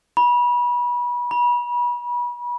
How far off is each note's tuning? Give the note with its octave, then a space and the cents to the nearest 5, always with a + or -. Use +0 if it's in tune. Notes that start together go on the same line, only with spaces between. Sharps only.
B5 -30
B5 -35